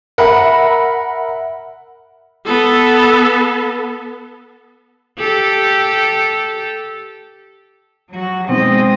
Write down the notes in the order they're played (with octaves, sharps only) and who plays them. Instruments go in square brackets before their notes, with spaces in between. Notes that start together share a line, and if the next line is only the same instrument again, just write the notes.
[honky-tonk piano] A#4 E5 F#5 B5
[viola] B3 A4
[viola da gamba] G4 A4
[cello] F#3 F#4
[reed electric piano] B2 B3 D#4 [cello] G#3 D#5 [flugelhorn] C4